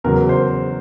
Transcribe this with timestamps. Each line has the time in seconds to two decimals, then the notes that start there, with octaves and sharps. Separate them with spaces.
0.04 E2 C#3 F#3 A#4
0.29 C5